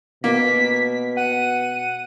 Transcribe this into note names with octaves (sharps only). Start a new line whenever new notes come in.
B2 A#3 B6
F#5 D#7